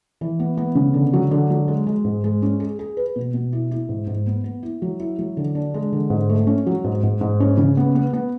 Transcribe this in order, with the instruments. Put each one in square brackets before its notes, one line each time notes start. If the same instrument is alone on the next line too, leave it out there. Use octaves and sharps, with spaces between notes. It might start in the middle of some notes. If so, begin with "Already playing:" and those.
[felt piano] E3
B3
B3
C#3
D3
F#3
D3
F#3
G#3
G#3
G#2
G#3
C#4
G#4
G#4
B4
B2
B2
E4
E4
G#2
G#2
B3
B3
E4
F#3
E4
F#3
D3
D4
G#3
D3
G#2
A3
C#4
F#3
G#2
G#2
G#2
C#4
C#3
B3
B3
B3